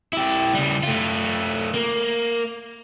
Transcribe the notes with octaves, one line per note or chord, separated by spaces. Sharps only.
E4 G4
C#3 G3
A3 F4
A#3